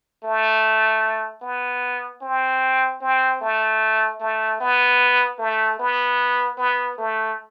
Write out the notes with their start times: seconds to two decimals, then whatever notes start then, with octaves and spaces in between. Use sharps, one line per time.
0.24 A3
1.42 B3
2.22 C4
3.01 C4
3.41 A3
4.20 A3
4.60 B3
5.39 A3
5.80 B3
6.58 B3
6.98 A3